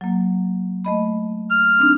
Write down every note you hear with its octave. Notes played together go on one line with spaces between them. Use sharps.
F#3 A#3
A3 D#5 B5
F6
C4 D4 D#4